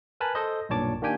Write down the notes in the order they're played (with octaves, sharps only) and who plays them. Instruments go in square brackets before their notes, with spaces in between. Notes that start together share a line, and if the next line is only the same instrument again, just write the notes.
[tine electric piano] A#4 B4 G#5 A5 B5
A4 C5 D#5
B1 G2 A#2 C#5 A5 D6
D#3 A#3 D4 G4 G5 G#5